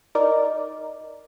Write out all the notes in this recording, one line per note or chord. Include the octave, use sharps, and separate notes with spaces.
D#4 A#4 D5